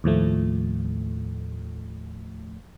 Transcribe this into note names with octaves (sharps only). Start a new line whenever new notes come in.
D#2 A2 F3 A3